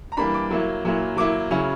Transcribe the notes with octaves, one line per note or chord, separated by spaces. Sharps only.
A#5
E3 G3 A#3 D4 B5
D6
F#3 A#3 E4
A#2 F#3 A#3 E4
F#3 A#3 E4 D6
C#3 F#3 C#4 E4